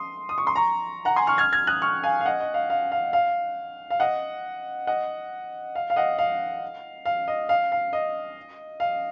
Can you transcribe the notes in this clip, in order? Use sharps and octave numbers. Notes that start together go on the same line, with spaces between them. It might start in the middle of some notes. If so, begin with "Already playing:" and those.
Already playing: C6 D#6
D#6
C#6
C6
A#5 C#6
F#5 A#5
G#5 C6
C#6 F6
F6 G#6
F6 G#6
D#6 F#6
C#6 F6
F5 G#5
F5
D#5 F#5
D#5
F5
F5
F5
F5
F5
D#5 F#5
D#5 F#5
F5
F5
D#5 F#5
F5
F5
D#5
F5
F5
D#5
F5